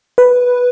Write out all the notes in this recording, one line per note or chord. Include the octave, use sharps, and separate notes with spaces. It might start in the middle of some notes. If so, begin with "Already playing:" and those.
B4